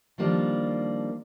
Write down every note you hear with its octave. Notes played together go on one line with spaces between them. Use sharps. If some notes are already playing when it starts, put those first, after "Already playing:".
D#3 F3 G3 A#3 D4